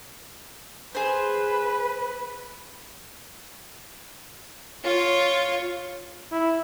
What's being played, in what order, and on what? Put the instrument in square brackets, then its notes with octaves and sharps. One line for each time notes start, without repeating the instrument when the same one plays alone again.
[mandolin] G#4 C5 [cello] B4
[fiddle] F4 C#5
[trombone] E4